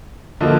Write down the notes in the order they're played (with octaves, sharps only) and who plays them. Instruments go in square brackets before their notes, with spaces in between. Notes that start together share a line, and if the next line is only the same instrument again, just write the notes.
[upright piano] D3 F3 A#3 D#5